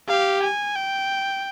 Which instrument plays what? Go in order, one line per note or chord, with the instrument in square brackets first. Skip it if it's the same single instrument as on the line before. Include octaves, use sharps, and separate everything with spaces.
[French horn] G4 [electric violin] F5
[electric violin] G#5
G5